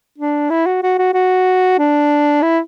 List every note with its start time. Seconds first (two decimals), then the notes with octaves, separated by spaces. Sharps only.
0.18 D4
0.50 E4
0.66 F#4
0.83 F#4
0.98 F#4
1.13 F#4
1.78 D4
2.42 E4